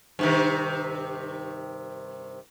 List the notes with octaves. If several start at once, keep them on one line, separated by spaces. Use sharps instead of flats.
G2 C3 D#3